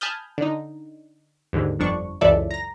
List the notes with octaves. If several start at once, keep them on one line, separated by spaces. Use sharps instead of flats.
G#5 A5 B5 D#6 F6 G6
D3 D#4
D#2 G#2 D3
G1 F2 D4 C#6
C#2 F#2 E3 A4 D5 E5
A#5 A#6